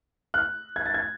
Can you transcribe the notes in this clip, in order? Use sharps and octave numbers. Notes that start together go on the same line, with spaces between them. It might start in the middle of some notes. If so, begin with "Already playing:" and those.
F#6
G#6
A6
G#6